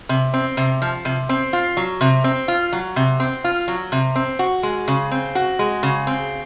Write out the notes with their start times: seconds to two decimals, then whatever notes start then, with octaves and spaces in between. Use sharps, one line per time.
0.09 C3
0.34 C4
0.57 C3
0.82 F3
1.05 C3
1.29 C4
1.53 F4
1.77 F#3
2.01 C3
2.24 C4
2.48 F4
2.73 F#3
2.96 C3
3.20 C4
3.44 F4
3.68 F#3
3.92 C3
4.16 C4
4.39 F#4
4.63 G#3
4.88 C#3
5.12 C4
5.35 F#4
5.59 G#3
5.83 C#3
6.07 C4